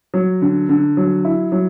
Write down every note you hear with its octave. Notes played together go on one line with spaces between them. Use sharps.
F#3
D3
D3
F#3
E4
F#3